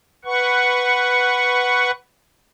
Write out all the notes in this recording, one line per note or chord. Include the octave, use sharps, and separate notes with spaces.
B4 F#5 C#6